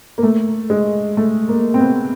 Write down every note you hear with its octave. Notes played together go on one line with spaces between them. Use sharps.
A#3
A3
G#3
A3
A#3
C4
B3